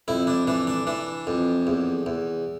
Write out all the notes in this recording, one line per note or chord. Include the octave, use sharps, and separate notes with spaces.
F2 E4
D4
E3 D4
D4
E3 D4
F2
E2
E2